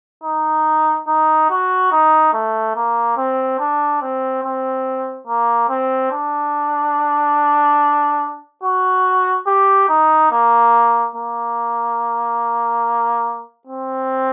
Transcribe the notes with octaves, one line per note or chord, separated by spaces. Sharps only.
D#4
D#4
F#4
D#4
A3
A#3
C4
D4
C4
C4
A#3
C4
D4
F#4
G4
D#4
A#3
A#3
C4